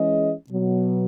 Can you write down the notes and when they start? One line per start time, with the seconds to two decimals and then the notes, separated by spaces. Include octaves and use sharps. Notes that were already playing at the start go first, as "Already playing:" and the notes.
Already playing: E3 G#3 C#4 G#4 D#5
0.49 B2 F#3 B3